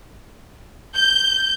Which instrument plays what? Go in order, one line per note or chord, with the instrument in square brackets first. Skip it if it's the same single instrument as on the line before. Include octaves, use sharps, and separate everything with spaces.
[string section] G6